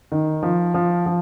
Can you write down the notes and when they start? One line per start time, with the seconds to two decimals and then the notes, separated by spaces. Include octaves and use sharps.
0.12 D#3
0.43 F3
0.74 F3
1.06 F3